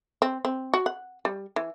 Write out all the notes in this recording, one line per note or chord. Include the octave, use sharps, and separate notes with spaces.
C4
C4
F#4
F#5
G3
E3